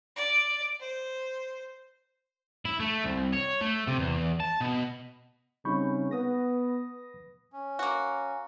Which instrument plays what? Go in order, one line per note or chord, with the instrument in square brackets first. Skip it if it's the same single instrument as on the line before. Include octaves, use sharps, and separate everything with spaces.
[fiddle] D5
C5
[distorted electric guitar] E4
A3
C2
C#5
A3
C3
E2
A5
B2
[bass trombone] C#3 [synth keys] G3 C4 D#4 [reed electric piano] B5 C#6 G6
[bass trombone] B3 [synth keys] B4 D#6 A#6
[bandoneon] C#4
[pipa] A#3 F#4